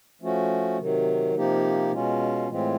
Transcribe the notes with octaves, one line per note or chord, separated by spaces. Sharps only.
F3 A3 C#4 F#4
C3 D#3 F#3
C3 F3 A#3 D#4 G4
B2 G#3 C#4 F4
A2 E3 G#3 C4 F4